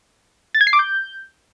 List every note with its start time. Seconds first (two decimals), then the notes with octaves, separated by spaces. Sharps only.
0.55 A6
0.61 G#6
0.67 C7
0.73 D6
0.79 G6